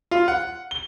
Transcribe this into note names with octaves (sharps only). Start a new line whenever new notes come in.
F4
F#5
G7